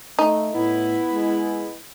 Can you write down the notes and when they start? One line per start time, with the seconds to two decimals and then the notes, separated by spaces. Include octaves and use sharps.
0.19 A3 D#4
0.54 A2 B3 E4
1.12 G#3